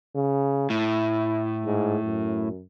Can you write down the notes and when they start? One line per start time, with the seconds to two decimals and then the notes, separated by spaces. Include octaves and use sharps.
0.15 C#3
0.70 A2 E4
1.65 G#2
2.05 F#2